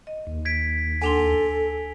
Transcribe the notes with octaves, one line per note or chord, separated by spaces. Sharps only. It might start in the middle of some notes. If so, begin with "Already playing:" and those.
D#5
D#2
G#6 B6 D7
D2 D4 A4 G#5 C6 F7 G7